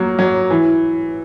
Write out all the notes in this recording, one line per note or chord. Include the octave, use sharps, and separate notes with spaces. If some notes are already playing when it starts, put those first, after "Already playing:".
Already playing: F#3 A#3
F#3
E3